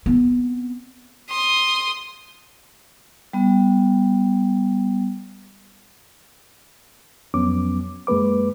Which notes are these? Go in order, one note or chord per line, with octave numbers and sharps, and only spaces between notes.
B3 C4
C6 D#6
G3 B3
F2 F#3 B3 C#4 D6
F#2 G#3 A#3 B4 D6